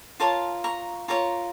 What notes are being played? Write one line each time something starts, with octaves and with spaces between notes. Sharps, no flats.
F4 A#4 C#5 A5 C6
A#5 C#6
F4 A#4 C#5 A#5 C#6